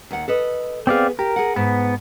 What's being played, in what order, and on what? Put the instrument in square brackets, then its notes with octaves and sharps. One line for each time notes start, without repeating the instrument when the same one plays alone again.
[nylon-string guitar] D#2 F#5
A4 B4 D#5
[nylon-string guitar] B3 G#4 [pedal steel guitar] C4 D5 F5
[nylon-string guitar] G4 [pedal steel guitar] A#4
[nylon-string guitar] G#4 F#5
[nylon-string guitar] G#2 [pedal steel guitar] B3